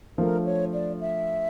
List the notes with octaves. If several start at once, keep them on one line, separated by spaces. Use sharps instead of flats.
F3 A3 D4 A#4
C#5
D5
E5